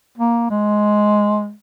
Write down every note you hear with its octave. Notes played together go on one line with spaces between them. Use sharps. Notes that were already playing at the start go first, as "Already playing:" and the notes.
A#3
G#3